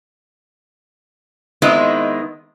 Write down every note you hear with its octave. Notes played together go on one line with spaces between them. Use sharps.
D#3 G#3 B3 C4 D#4 E4